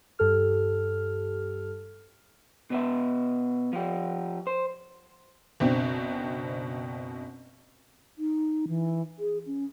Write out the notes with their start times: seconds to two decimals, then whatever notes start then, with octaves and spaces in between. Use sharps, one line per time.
0.19 G2 G4 A4 F6
2.70 B2 B3 E5
3.73 F3 G4
4.47 C5
5.60 F#1 B2 C4 D4
8.19 D#4
8.68 E3
9.19 G#4
9.46 C#4